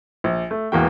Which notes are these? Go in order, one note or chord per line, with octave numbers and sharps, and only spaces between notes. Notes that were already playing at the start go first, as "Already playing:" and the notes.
A#1
A3
E1 E2 A#3 F#4 G5